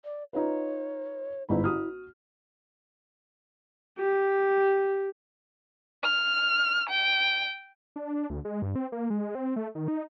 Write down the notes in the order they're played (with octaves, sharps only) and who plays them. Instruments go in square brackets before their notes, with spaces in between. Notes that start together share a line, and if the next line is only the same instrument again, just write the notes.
[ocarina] D5
[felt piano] D#4 F4 B4 [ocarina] C#5
[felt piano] G1 G#2 B5 [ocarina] E4
[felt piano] F#4 D#6 F6
[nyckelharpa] G4
[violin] F6
G5
[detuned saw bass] D4
D2
G#3
G2
C4
A#3
G#3
C4
A3
D#3
D#4